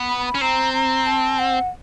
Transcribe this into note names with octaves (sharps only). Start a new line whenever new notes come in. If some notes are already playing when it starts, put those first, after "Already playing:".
Already playing: B3
B5
B5
C#4
C4 A#5
A#5
A5
F#5